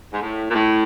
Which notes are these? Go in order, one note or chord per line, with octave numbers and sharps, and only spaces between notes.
G#2
A2
A#2
A2